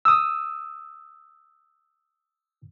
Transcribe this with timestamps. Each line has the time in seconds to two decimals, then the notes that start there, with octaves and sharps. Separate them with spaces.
0.05 D#6 E6